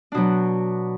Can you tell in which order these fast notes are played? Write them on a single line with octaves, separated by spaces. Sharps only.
D4 B2 F#3